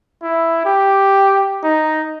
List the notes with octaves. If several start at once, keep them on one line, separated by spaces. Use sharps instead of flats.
E4
G4
D#4